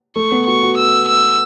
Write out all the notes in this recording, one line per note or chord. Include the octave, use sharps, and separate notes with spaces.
A3 C#6
B3
F#4 C#6
F#4
E6
E6